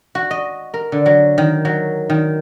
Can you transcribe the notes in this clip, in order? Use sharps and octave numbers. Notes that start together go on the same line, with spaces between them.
F#4
D#5
A#4
D3
F#3
D#3
F#3
D#3